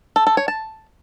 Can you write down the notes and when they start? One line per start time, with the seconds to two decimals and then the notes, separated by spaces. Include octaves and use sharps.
0.16 A4
0.27 A4
0.37 C#5
0.48 A5